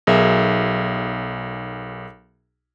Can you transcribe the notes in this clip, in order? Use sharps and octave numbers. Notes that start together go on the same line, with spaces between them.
B1 G#4 A#4 E5